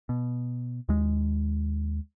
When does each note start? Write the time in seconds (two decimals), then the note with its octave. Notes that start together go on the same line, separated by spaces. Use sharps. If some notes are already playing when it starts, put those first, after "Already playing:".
0.09 B2
0.89 D#2 G#3